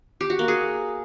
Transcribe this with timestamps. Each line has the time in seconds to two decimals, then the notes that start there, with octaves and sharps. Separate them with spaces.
0.21 G4
0.30 F#4
0.39 A#3
0.48 G#4